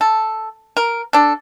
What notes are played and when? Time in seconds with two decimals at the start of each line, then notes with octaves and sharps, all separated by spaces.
0.01 A4
0.77 A#4
1.13 D4 A4